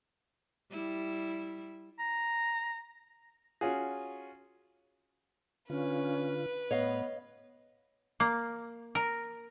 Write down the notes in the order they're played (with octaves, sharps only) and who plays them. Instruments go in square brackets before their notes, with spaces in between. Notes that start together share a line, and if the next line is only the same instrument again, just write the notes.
[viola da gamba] G3 E4
[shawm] A#5
[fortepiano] C#4 F4 F#4 G#4
[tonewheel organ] D3 F4 [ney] C#4 [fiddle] B4
[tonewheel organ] A2 [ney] B3 [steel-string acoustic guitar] C#5 D#5 F5
[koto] A#3
A#4